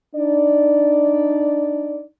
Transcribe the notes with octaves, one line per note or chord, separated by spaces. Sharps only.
D4 D#4 D5